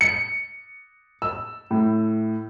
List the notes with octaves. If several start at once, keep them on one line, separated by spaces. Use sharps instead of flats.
C#7
E6
A2